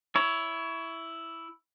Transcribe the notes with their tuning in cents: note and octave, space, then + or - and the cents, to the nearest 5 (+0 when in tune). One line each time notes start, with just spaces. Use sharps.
E4 +0 C#5 +20